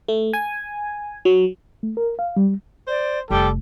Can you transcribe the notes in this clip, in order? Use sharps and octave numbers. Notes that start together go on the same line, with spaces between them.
A3
G#5
F#3
A3
A#4
F5
G3
C5 D5
F1 G3 A4 G5 D6